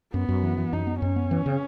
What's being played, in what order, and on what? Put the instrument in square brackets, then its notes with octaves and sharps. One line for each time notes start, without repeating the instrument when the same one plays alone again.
[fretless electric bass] F#2 [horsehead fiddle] B3
[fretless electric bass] F#2
E3
E3
[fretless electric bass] F#2 [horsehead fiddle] D#4
[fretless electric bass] B3
[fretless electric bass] F#2 [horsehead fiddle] C#4
[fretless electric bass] B3
E3
C#3